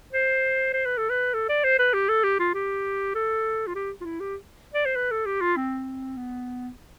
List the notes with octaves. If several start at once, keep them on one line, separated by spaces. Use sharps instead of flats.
C5
C5
B4
A4
B4
A4
D5
C5
B4
G4
A4
G4
F4
G4
A4
F4
G4
F4
E4
G4
D5
C5
B4
A4
G4
F4
C4
B3